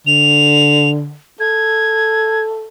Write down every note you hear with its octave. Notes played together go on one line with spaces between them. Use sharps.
D3 F7
A4 G#6